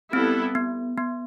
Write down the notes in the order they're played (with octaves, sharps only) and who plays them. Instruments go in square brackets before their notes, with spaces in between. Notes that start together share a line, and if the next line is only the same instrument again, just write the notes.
[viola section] G3 B3 E4 A4 [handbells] C4
[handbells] B3
B3